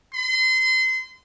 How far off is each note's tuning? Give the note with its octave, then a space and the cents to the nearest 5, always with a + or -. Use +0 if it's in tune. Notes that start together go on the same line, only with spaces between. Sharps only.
C6 -30